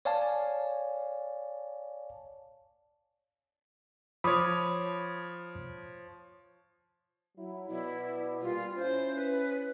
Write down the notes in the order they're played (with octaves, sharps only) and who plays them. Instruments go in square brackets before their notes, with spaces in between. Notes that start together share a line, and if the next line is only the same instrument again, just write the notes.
[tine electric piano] C#5 D5 F5 G#5 A5
[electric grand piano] F3 C#5 [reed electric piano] B5 D6 D#6
[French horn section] F#3 E4
[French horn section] B2 D5 [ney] E4
[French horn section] A#2 G3 [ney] F4
[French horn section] C#4 E4 [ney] C5
[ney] B4